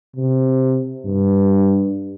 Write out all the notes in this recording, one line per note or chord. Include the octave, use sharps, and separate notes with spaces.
C3
G2